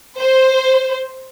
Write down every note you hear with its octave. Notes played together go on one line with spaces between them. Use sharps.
C5